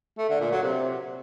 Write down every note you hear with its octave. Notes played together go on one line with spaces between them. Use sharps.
A3
D3
A#2
F#3
C3